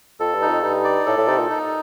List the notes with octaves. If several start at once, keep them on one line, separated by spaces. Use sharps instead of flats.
F2 A4
G2
D#4
F2
G2 D#4
D5
A2 A4
A2
C3 D#4
A#2
D#4